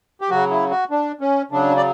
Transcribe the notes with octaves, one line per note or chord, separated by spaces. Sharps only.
G4
C#3 F#3 F#4
E4
F#4
D4
C#4
C#3 F#3 D4
D5